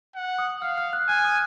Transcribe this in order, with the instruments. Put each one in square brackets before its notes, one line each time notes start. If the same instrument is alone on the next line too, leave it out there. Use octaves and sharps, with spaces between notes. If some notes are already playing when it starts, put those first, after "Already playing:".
[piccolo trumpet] F#5
[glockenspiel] D#6
[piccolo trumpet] F5 [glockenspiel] F6
[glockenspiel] F6
F#6
[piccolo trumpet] G#5 [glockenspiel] F#6
[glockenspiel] D#6